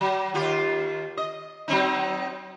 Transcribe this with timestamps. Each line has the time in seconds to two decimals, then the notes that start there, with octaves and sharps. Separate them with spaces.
0.01 F#3
0.34 D#2 F4 G4
1.17 D#5
1.68 F#3 C4 D#4